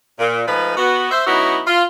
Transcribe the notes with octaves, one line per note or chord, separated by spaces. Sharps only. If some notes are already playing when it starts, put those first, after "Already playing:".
A#2
F3 G#3 A3 D#4 B4
B3 F#4
C5 E5
F#3 B3 C#4 D#4 E4 F#4
F4